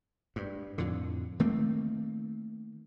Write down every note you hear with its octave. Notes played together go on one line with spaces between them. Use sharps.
G2
F2 A2 D3
D#3 A3 A#3 C4